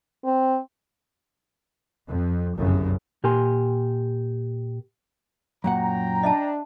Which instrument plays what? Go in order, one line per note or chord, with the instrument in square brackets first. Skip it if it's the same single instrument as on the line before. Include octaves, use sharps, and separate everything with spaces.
[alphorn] C4
[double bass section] F2
G1 C2 F#2 C#3
[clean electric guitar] A#2 G4 A#4 G#5 C6
[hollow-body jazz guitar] F#2 A#2 F#5 [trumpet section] G5 A#5
[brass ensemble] D4 [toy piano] D#5 E5 A5